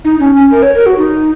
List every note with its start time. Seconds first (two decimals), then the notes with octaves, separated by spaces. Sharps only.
0.05 D#4
0.20 C#4
0.35 C#4
0.51 A#4
0.62 C#5
0.75 A#4
0.86 F#4
0.98 D#4